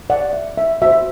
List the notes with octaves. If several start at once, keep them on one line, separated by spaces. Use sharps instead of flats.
D5 F#5
E5
E5
F#4 C5 E5